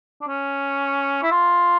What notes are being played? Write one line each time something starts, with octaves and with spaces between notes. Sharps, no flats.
D4
C#4
E4
F4